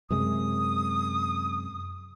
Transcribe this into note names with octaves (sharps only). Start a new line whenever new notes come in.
F#2 C3 G#3 D#6